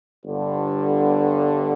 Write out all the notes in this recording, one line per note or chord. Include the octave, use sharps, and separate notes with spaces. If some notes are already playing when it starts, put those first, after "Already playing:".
G1 G2 D3